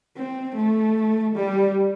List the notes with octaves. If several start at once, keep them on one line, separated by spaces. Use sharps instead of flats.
C4
A3
G3